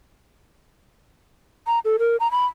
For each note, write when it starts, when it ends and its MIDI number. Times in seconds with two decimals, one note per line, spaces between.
1.67 1.79 82
1.85 1.97 69
1.99 2.16 70
2.20 2.30 82
2.31 2.46 83